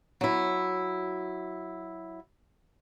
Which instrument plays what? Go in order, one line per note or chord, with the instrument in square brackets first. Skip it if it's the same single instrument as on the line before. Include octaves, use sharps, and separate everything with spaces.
[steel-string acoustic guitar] F#3 E4